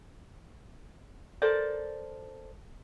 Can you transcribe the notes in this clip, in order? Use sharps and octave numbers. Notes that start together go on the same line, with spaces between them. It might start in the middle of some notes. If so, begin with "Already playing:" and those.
A4 A#4 C5 D5